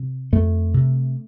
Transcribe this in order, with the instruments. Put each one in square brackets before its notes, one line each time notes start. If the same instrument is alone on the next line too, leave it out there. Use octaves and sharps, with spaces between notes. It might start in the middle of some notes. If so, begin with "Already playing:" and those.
Already playing: [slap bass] C3
F2 A3
C3